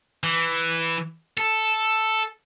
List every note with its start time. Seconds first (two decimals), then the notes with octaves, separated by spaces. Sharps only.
0.23 E3
1.38 A4